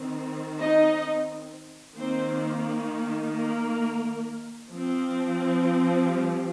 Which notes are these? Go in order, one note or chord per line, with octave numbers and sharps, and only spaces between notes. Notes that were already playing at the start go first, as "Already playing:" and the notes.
Already playing: D#3 C4
D#4 D#5
D#3 A#3 C4 C5
A#3 A#4
F3 C4
G3 G4